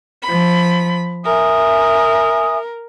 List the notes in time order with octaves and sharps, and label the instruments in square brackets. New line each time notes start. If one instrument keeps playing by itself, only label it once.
[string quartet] F3 B5
[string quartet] A#4 [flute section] E5 G#5 D#6